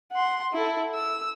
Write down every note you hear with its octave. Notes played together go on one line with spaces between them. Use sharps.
F#5 C6
E4 A4
E6